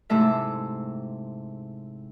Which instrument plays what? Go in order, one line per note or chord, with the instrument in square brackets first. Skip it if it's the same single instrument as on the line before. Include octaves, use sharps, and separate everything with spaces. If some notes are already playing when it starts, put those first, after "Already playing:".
[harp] G#2 C3 A3 E4 E5 A5